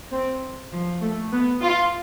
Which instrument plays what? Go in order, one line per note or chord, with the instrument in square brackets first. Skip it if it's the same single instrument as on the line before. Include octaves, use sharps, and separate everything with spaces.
[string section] C4
F3
A3
B3
F4